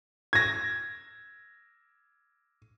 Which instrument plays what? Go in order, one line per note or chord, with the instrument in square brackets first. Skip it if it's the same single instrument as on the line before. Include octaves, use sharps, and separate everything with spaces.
[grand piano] G#6 A#6